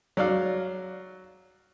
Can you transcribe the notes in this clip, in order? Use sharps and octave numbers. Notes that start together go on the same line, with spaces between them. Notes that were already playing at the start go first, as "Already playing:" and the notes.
F#3 D5 F5